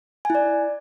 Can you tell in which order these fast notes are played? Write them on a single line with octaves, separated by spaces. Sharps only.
G#5 E4 D5